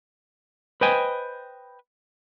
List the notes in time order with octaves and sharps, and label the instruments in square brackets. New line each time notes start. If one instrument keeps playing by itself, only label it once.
[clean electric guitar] B4 C5 D#5 G5 G#5